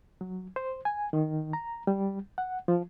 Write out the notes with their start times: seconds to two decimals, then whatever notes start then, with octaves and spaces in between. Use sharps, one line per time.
0.21 F#3
0.56 C5
0.85 G#5
1.13 D#3
1.53 A#5
1.87 G3
2.38 F#5
2.68 F3